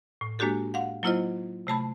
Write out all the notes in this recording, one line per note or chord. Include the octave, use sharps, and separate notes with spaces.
A2
G#3 A#3 D4 F#4 G4 A4
F5 F#5
F#3 A#3 E4 F4 C5 D#5
C3 A3 A5 B5